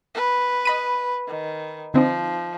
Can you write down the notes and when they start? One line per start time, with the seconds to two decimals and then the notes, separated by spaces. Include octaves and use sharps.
0.15 B4
0.65 D#5 B5 D#7
1.27 D#3
1.94 D3 F3 C4 D#4